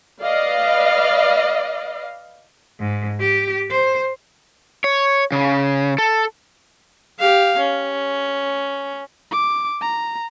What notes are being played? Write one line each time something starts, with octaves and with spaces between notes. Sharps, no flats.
B4 D5 D#5 F5
G#2
G4
C5
C#5
C#3
A4
G4 F5
C#4
D6
A#5